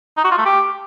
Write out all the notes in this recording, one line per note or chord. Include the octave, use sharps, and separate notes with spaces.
D#4
F#4
F4
A3
G4